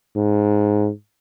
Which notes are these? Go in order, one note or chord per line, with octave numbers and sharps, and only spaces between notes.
G#2